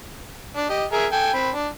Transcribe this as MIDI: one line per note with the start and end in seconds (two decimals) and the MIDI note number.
0.56 0.67 62
0.69 0.84 67
0.69 0.84 75
0.92 1.06 68
0.92 1.06 70
0.92 1.06 76
1.12 1.32 69
1.12 1.32 79
1.12 1.32 80
1.34 1.49 60
1.34 1.49 83
1.55 1.68 62